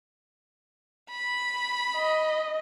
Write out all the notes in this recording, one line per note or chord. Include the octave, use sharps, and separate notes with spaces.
B5
D#5